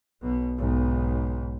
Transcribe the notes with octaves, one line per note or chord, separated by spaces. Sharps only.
B1 B2
B1 G#2